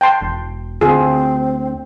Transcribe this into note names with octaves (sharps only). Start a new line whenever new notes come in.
G5 A5 C6
E1
D2 C4 F4 G#4